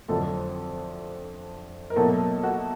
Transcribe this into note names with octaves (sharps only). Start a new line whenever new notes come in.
F2 D3 F#3 A3 A4
A#4
B2 F#3 A3 A#3 A4
F#4